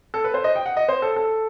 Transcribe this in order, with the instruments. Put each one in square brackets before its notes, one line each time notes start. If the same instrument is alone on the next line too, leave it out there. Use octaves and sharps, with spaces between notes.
[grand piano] A4
B4
C5
D#5
G5
F#5
D#5
C5
A4
A4